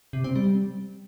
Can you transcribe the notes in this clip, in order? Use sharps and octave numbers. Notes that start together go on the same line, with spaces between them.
C3
C4
G3